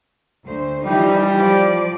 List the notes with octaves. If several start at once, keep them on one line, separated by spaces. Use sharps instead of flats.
D2 C5
E3 F3 G3 D#4
F3 D5